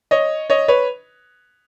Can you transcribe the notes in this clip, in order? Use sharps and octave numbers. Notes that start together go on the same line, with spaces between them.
C#5 D#5
C#5 D#5
B4 C#5